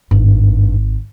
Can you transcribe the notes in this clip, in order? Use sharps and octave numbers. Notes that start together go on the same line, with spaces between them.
G#1 G2